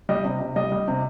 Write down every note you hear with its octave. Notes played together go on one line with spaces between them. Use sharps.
G3 D#5
C3
C3
G3 D#5
G3
C3